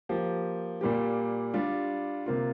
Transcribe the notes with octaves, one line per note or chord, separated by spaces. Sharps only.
F3 A#3 G4
A#2 G3 A#3 G4
G3 D4 F4
C3 A#3 F4